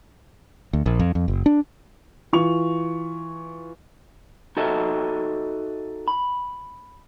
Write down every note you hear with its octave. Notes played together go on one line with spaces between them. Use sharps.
D2
A#1
F2
F2
F#1
D4
E3 F4 C#6 F7
D#4 F#4 A4 D#5 E5
B5